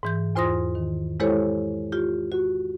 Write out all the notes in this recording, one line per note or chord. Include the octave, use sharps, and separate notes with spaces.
G#2 E3 G6
E2 F4 C5 C6 D#6 A#6
D#3
G#3 E4 G4 A4 C5 C#5
F4 G4
F#4